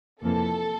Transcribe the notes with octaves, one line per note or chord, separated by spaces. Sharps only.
F2 C3 E3 A#3 A4